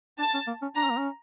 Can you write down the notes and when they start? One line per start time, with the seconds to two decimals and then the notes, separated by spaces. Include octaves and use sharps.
0.19 D4 A5
0.34 C#4
0.47 A#3
0.62 C#4
0.76 D4 A#5
0.84 C#4
0.90 A#3
0.98 C#4